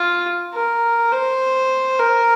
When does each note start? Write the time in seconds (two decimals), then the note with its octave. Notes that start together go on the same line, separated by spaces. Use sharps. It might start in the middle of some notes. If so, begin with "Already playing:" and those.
Already playing: F4
0.54 A#4
1.12 C5
1.99 A#4